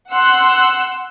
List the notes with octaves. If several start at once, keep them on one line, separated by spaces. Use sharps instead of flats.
F#5 C6 E6 F#6